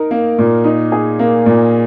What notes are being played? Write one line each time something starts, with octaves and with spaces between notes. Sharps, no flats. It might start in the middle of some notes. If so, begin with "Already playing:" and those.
Already playing: D#4 A#4
A#3
A#2
D#4
G#4
A#3
A#2